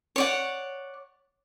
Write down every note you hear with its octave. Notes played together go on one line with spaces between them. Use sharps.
C#5 D5 F#5